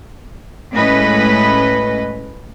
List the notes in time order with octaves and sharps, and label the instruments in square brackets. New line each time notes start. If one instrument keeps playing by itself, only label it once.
[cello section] A2 G#3 C#4 B4 D#5